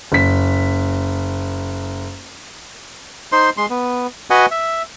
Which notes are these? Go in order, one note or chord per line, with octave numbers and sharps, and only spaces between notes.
F#1 B6
D#4 C5 C6
G#3 C6
B3
F#4 B4 D#5 F#5 G#5
E5